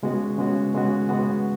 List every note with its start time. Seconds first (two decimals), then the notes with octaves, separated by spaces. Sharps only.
0.03 C#3 G#3 B3 F#4
0.38 C#3 G#3 B3 F#4
0.74 C#3 G#3 B3 F#4
1.09 C#3 G#3 B3 F#4